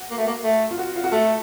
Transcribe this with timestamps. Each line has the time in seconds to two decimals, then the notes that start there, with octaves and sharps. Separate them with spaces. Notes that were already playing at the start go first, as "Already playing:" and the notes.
Already playing: F#4
0.11 A#3
0.18 A3
0.27 A#3
0.44 A3
0.71 F4
0.78 F#4
0.96 F4
1.04 F#4
1.12 A3 A4